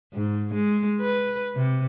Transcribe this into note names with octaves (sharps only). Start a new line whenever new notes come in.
G#2
G#3
B4
C3